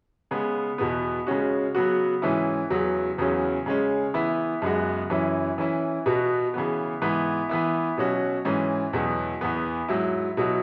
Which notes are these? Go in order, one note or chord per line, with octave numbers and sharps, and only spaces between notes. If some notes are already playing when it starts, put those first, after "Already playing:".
C#3 G#3 B3
E2 B2 B3
C#3 G#3 C#4 F#4
C#3 F#3 B3 F#4
G#2 E3 C#4 E4
E2 C#3 F#3
E2 C#3 F#3 C#4
C#3 G#3 C#4
E3 B3 E4
F#2 C#3 G#3 B3 F#4
F#2 E3 C#4 E4
E3 C#4 E4
B2 B3 F#4
C#3 E3 B3
G#2 E3 B3 E4
E3 B3 E4
B2 F#3 C#4 F#4
G#2 E3 C#4
E2 B2 F#3
E2 E3 B3
G#2 F#3 E4
B2 F#3 E4